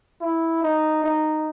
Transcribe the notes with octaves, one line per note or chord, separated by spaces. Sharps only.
E4
D#4
D#4